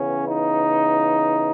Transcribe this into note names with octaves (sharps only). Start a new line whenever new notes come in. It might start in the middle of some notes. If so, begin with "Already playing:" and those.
Already playing: C#3 E3 B3 C#4
D#4